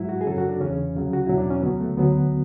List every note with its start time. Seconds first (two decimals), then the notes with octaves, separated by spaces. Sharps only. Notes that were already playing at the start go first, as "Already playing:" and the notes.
Already playing: G#2 F#3 E4
0.09 F#4
0.21 G#4
0.26 F#2 C#3 F#3 A4
0.38 F#4
0.49 D4
0.60 E2 C#3 E3 C#4
0.95 D2 C#3 F#3
1.13 F#4
1.26 E2 B2 F#3 E4
1.38 D4
1.50 C#4
1.62 D2 C#3 F#3 B3
1.80 A3
1.97 D2 D3 F#3 B3